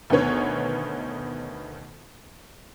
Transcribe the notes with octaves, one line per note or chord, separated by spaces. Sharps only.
D2 B2 D#3 B3 C#5